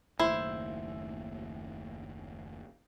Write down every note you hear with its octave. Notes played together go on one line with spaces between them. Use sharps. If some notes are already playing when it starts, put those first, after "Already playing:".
F#1 D#2 A2 E4 C5